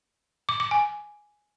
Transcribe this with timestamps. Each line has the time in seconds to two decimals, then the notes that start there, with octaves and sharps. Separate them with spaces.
0.49 D6
0.60 D6
0.71 G#5